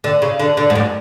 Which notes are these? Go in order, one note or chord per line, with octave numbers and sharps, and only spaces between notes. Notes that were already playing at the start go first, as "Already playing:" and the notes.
D3
C#3
D3
D3
G#2
F#2